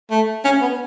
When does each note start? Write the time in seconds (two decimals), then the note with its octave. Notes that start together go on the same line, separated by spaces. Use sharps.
0.11 A3
0.45 C#4
0.61 B3